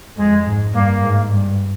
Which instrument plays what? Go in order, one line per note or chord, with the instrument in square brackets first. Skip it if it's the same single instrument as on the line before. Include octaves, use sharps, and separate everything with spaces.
[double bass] F2 [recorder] G#3
[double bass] G#2
[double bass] G2 [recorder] A#3
[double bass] G#2
G2